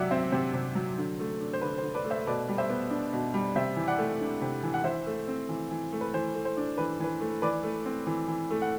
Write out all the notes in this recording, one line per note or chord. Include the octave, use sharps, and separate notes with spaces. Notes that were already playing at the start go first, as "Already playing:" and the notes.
Already playing: C3 F#3 D5 E5 F#5
C4 C5 E5
C3 C5
C3
F#3
D3
A3
D4
C5
D3 B4
C5
D3
B4 D5
A3
C5 E5
B2 B4 D5
G3
C5 E5
B3
D4
B2
G3
C3 C5 E5
E3
D5 F#5
A3
D4
C3
E3
F#5
E3 C5 E5
A3
C4
E3
E3
A3
B4
E3 C5
A3
C5
D4
E3 B4
E3 B4
A3
E3 B4 D5
A3
C4
E3
E3
A3
F#5